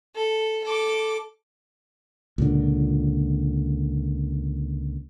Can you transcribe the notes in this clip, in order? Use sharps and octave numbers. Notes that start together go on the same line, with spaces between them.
A4
A4 D6
C#2 A#2 D3